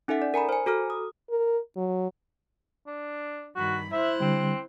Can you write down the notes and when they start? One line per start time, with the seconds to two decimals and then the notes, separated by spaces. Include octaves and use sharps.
0.08 C#4 D#4 A4 E5 F#5
0.22 D5
0.34 A#4 G#5 A#5 B5
0.49 C5 G#5
0.66 F#4 A4 A#5 F6
0.90 D#6
1.30 A#4
1.77 F#3
2.87 D4
3.55 G2 D#3 F#4 B5
3.92 E4 C5 E5 F#6
4.20 D3 G3 C4